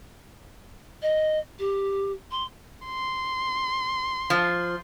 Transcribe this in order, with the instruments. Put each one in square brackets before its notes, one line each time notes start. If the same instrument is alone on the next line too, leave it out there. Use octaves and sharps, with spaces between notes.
[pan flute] D#5
G4
C6
[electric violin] C6
[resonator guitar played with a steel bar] F3